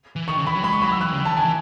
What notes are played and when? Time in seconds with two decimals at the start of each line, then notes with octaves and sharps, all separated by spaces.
0.16 E3
0.28 D#3 C#6
0.38 C#3
0.46 E3 B5
0.55 F#3
0.64 G#3 B5
0.73 C#6
0.82 F#3 B5
0.92 E6
1.00 E3 F#6
1.13 C#3
1.24 E3 A5
1.36 D#3 G#5
1.45 E3